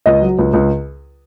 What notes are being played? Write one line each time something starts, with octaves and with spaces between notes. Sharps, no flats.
C#2 D#5
F#3
C#2
C#2